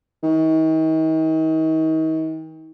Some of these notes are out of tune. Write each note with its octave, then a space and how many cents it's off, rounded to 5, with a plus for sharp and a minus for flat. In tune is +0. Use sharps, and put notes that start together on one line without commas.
D#3 +40